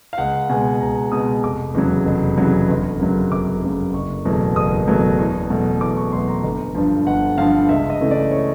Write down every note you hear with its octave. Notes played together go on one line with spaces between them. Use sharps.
F5
C#2 F#5
B2 G#3 G#5
C#2 A#5
B2 G#3 D#6
F1 D6
E2 C#3 F#3
F1
E2 C#3 F#3
G1
F#2 C#3 F#3
G1 D6
F#2 C#3 F#3
F#1 C#6
E2 B2 F#3 A3
F#1 D#6
E2 B2 F#3 A3
E2
B2 F#3 A3
E2 D6
C#6
B2 F#3 A3 C6
A#5
G1
G2 D3 F3
G1 F#5
G2 D3 F3 F5
C#2 E5
D#5
C#3 E3 A3
D5
C#5